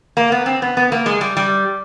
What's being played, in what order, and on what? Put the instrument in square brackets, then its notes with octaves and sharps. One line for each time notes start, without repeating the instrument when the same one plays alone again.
[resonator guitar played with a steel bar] A#3
B3
C4
B3
B3
A#3
G#3
G3
G3